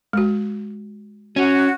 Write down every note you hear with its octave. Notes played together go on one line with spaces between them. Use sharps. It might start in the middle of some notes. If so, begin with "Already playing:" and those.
G#3 F#4
C#4 F#4